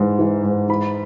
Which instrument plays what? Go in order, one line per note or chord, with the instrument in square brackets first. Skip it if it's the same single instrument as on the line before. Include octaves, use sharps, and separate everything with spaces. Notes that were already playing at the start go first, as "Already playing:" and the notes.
Already playing: [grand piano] G#2 E3
E3
G#2
E3 B5